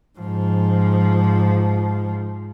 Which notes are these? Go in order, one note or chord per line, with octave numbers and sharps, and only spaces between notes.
G#2 F3